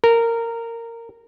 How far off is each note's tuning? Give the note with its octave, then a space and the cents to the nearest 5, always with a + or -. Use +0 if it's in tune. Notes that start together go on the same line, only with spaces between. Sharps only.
A#4 -15